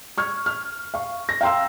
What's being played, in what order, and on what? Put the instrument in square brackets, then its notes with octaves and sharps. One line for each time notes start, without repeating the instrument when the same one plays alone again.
[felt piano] C#6 F6 G#6
F6
F5 C#6
A#6
F5 G5 A#5 C6 E6